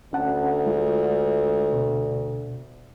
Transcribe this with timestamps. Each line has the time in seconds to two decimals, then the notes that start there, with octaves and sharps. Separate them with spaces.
0.13 D2 C#4 F#5 A5
0.66 G#3 F4
1.73 B2